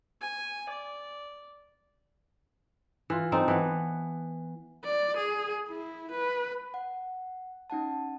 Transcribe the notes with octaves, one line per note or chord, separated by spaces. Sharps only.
G#5
D5
E3 F4
C4 D#4 A4
E3 B3
D5
G#4
E4
B4
F#5
C#4 D#4 F#5 A5